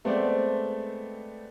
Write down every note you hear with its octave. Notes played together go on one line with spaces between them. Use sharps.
G#3 A3 B3 C4 C5 D5